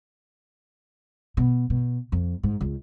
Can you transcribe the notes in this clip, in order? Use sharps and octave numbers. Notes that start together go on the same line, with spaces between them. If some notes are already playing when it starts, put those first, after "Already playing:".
B2
B2
F2
G#2
C#2